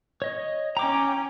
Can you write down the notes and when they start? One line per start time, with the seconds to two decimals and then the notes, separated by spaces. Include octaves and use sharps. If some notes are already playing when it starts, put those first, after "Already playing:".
0.22 C#5 D#5
0.77 C#4 G5 A#5 D6